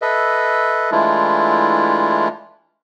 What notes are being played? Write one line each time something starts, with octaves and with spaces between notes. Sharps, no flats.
A4 B4 D#5 E5
E3 G#3 A3 D4 E4 F4